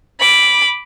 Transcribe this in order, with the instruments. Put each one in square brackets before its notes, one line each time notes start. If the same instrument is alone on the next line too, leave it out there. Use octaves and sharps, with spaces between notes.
[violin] B5 D6